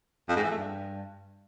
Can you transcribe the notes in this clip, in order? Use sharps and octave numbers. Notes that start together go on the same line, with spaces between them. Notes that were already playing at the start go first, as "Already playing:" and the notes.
F2
G#2
E3
A3
G2